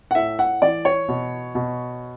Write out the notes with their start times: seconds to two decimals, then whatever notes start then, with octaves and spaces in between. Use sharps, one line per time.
0.11 F#5
0.15 A2 E5
0.39 F#5
0.62 E3 D5
0.85 C#5
1.08 B2
1.55 B2